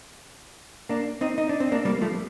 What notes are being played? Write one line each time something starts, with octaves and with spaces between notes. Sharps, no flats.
A#3 D4
C4 D#4
D#4
D4
C4
A#3 D4
G3 A#3
F3 A3